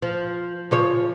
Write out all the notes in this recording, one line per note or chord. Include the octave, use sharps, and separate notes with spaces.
F3
C#3 F3 C#5